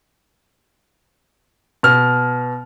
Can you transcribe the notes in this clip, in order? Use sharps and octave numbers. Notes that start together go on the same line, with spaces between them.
B2 F6